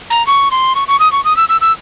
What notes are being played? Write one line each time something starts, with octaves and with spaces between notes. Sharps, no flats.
A#5
C#6
C6
C#6
C#6
D#6
C#6
D#6
E6
E6
E6